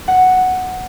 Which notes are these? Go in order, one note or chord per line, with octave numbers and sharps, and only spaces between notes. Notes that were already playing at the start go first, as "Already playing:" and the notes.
F#5